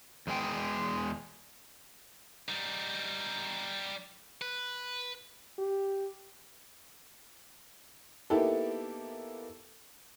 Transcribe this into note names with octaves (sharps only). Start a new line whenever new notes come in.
E2 G#3 G#4 G5
G3 D#4
B4
G4
A#3 B3 D#4 E4 G4 A4